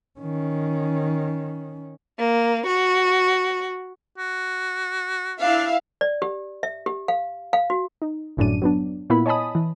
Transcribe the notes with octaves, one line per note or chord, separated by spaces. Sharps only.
D#3 C#4
A#3
F#4
F#4
D4 E4 E5 F5
D5
G4
E5
G4
F5
F5
F#4
D#4
G1 F#2 A2 D4 D#7
F#3 B3 D4
A#2 B3 E4 B5
C#5 D#5 G#5 A5 B5 D#6
E3